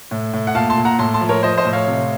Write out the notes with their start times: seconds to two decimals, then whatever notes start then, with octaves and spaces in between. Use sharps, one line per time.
0.11 A2
0.33 A2
0.47 F#5
0.55 A#2 F5 A5
0.70 A5 C6
0.78 A#2
0.85 F#5 A#5
0.99 A2 A5 C6
1.14 A5 C6
1.21 F3
1.29 A#4 C#5
1.43 F3 C5 D#5
1.58 C5 D#5
1.65 A2
1.73 C#5 F5
1.87 C3